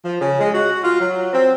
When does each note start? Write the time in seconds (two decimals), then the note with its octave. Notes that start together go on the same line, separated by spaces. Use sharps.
0.05 F3
0.21 C#3
0.39 G#3
0.53 F#4
0.83 F4
1.00 F#3
1.32 C4